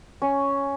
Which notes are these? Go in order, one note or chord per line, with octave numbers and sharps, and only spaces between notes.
C#4